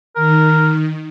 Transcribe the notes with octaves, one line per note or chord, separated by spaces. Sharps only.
D#3 A#4